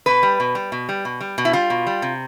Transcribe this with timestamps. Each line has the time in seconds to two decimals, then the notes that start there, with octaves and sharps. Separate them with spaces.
0.06 B2 B4
0.23 G3
0.40 B2
0.55 G3
0.72 B2
0.89 G3
1.05 B2
1.21 G3
1.38 B2
1.45 E4
1.53 G3 F4
1.70 B2
1.87 G3
2.02 C3